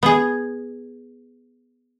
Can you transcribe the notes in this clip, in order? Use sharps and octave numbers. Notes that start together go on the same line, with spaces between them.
B3 G#4